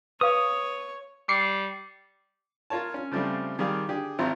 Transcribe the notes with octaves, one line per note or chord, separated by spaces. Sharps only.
B4 C#5 F5 D#6
G3 D6 C7 C#7
F4 A#4 C#5 A5
C#4
C#3 F3 G3 A3 C4
D#3 G3 G4 G#4 F5 F6
D3 G4 G#4
G#1 C4 E4 F4 A#5